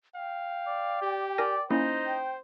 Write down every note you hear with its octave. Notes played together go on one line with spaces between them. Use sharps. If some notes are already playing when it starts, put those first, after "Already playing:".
F5 G5
D5
G4
A#4 D5 G#5 A#6
A#3 C#4 D#4 E4 C5
G5